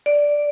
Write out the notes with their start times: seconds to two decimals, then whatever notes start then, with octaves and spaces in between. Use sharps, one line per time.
0.06 D5